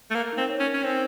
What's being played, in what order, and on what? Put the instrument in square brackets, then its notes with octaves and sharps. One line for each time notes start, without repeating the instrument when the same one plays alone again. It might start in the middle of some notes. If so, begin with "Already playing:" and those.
[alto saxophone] A3
[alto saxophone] A#3 [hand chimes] A#4
[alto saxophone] C4 [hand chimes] D#4
[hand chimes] C#5
[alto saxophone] C#4
[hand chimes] A#4
[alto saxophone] C#4
[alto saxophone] C4 [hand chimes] D#4